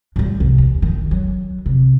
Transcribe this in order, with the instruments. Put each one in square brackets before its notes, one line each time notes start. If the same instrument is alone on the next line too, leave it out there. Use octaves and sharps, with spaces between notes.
[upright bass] A2 G3
C2
D#2
D#3
F#3
C3